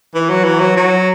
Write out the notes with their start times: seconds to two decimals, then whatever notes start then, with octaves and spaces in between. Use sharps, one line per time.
0.14 E3
0.29 F#3
0.44 E3
0.60 F#3
0.76 F#3